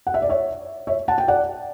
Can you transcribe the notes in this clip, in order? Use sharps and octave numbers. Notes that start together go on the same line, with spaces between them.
F#5
E5
D5
C#5 E5
C#5 E5
F#5 A5
G5
D5 F#5